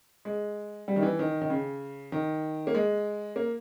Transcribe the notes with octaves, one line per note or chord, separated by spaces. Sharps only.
G#3
G3
D#3
E3
D#3
D#3
C#3
D#3
A#3
G#3
A#3